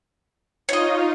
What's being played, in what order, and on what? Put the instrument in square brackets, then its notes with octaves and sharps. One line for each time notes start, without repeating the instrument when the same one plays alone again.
[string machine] D#4 F4 [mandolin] C#5 D#5